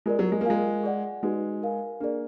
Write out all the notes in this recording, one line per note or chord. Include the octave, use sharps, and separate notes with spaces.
G#3 F4 A#4 D5
F#3
G#3
A#3
G#3 F4 A#4 F5 G#5
G#4 D5 F#5
G#3 D#4 F#4 B4
A#4 F5 G#5
A#3 D4 G#4 D5